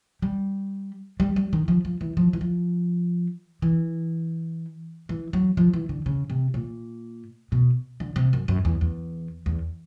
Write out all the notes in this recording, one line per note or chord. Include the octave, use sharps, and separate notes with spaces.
G3
G3
G3
D#3
F3
F3
E3
F3
E3
F3
E3
E3
F#3
F3
E3
D3
C#3
C3
A#2
B2
D3
C3
F#2
F#2
E2
E2
E2